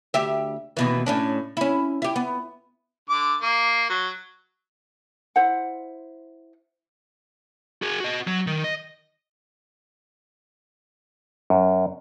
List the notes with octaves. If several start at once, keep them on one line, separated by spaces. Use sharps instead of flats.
D2 G4 E5
D#2 B2 E3
A2 C#4 D4
C#4 E4
E4 G4
B3
D3 D6
A#3
F#3
E4 C5 F#5
F#4 G#4
F#4 D#5
F#3
D#3
D#5
F#2